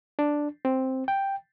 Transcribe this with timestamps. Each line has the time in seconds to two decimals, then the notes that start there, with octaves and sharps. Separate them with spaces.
0.19 D4
0.65 C4
1.08 G5